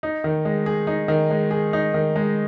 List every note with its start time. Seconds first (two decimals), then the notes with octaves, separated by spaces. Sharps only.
0.03 D#4
0.24 D#3
0.45 G#3
0.66 G#4
0.87 D#4
1.08 D#3
1.30 G#3
1.51 G#4
1.73 D#4
1.94 D#3
2.16 G#3